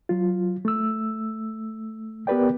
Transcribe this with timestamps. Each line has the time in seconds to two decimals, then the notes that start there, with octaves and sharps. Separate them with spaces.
0.09 F#3 F4
0.65 A3 E6
2.27 B3 G4 A#4 B4 D5 G5